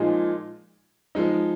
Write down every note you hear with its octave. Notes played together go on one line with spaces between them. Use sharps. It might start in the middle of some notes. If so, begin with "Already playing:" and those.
Already playing: A#2 F3 G#3 D#4 G#4
F3 G#3 D#4